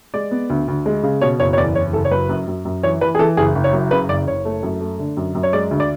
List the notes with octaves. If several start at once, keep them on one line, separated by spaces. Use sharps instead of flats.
G#3 D5
B3
D2
D2
G#3
C#3
B2 C#5
F#1 C#5
C#5
E2 D5
F#1 C#5
F#1 A4
C#5
F#3 B4
F#2
F#2
F#2
E3 C#5
E3 B4
G#4
E3 A4
F#1 G#4
F#1
C#5
F#2
C#3 B4
F#1 D5
F#1 C#5
A3
F#2
A3
D3
F#2
F#2
C#5
G#3 D5
D2
D5